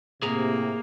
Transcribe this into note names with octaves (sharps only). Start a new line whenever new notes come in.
A2 C3 A#3 G#4 A#5